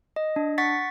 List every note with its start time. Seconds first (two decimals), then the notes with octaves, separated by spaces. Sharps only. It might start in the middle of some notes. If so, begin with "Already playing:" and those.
0.16 D#5
0.36 D4
0.58 F#5 C#6 A6 B6